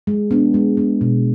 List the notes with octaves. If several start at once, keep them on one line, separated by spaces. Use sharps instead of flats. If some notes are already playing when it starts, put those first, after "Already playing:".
G#3
B3 D4
G#3
B3 D4
B2